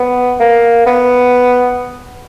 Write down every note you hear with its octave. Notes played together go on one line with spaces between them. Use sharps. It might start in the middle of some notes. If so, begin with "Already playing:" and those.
Already playing: B3
A#3
B3